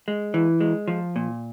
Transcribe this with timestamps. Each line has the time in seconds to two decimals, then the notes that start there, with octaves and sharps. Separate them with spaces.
0.08 G#3
0.34 E3
0.61 G#3
0.88 F3
1.16 A#2